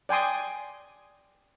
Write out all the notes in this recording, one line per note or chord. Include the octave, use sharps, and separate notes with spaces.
D5 G5 G#5 C6 D#6